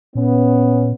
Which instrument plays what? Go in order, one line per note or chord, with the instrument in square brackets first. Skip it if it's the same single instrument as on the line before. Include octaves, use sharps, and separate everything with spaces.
[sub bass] A#2 [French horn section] B3 C#4